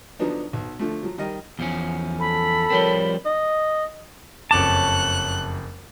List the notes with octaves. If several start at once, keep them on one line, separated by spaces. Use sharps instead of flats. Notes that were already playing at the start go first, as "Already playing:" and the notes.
D3 F3 F#3 B3 D4 D#4
B1
D3 F3 A3
F3 F#3
D#3 G3 A#4 D#5
E2 F3 C#4
A4 B5
F3 G3 C4 A#4 C#5 G7
D#5
F#1 F2 C#5 A5 D6 F#6